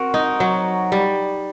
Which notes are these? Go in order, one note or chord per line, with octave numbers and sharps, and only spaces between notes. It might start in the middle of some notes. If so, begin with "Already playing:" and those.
Already playing: C4 F#4 A#4
D#4
F#3
G3